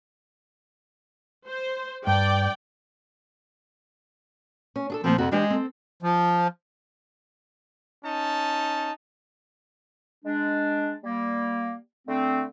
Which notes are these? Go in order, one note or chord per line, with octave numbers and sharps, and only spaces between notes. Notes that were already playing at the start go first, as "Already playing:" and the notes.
C5
G2 D5 G5
C#4
D4 G#4 A4
D2 A#2 F3 C4
F2 C3 F#4 F#5
E3 G#3 D4 G4
C4 A4
F3
C#4 D#4 A5
G#3 D4
G3 A#3
D3 A3 C4